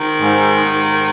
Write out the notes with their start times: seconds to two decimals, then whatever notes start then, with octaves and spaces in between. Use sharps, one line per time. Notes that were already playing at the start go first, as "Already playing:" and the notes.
Already playing: D#3
0.21 G#2
0.63 G#2